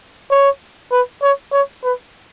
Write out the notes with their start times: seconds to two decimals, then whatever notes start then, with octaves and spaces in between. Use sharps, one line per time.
0.31 C#5
0.92 B4
1.22 C#5
1.53 C#5
1.84 B4